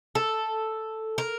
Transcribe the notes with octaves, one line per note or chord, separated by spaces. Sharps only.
A4
A#4